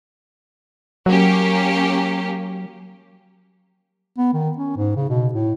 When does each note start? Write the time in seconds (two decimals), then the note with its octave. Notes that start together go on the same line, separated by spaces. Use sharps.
1.06 F#3 A#3 C#4 G4
4.18 B3
4.33 D#3
4.57 C#4
4.77 G#2
4.96 C#3
5.10 B2
5.33 A2